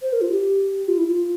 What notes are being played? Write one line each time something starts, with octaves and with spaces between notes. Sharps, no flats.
C5
A#4
F4
G4
F4
E4
F4